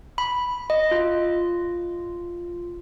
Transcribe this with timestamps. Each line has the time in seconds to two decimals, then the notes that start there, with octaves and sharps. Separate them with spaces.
0.18 B5
0.70 D#5
0.91 F4